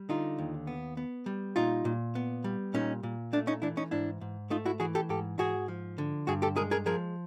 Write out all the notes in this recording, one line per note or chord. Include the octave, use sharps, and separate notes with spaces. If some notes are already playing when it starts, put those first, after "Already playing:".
Already playing: G3
D3 D#4 F4
D#2
B3
B3
G3
A#2 D#4 F4
A#2
B3
G3
A#2 C#4 D#4
A#2
A3 D4
C#4 D#4
E3 D4 E4
C#4 D#4
G#2 D4 E4
G#2
A3 D#4 F4
E4 F#4
E3 F#4 G#4
G4 A4
G#2 G4 A4
G#2 F#4 G#4
F3
D3
G2 F#4 G#4
G4 A4
G#3 G#4 A#4
G#4 A#4
F3 G#4 A#4